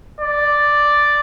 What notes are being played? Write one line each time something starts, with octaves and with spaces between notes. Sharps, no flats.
D5